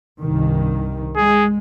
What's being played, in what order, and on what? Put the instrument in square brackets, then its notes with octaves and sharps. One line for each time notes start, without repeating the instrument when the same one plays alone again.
[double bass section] C2 G2 D#3
[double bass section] G#3 [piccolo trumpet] G#4